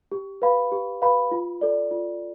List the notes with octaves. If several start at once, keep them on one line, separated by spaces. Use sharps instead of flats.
G4
B4 F5 B5
G4
B4 F5 B5
F4
A4 D5
F4